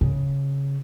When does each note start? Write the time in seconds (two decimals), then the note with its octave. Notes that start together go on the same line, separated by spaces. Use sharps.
0.01 C#3